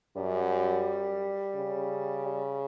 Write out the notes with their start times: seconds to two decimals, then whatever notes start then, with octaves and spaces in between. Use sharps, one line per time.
0.16 F#2 G3
1.55 C#3
2.25 G3